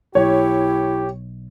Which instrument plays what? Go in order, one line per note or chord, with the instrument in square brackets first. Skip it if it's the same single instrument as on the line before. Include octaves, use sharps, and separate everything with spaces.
[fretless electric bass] B1 [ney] E4 [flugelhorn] G4 [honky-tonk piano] C#5